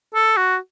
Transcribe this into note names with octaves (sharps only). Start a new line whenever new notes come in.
A4
F#4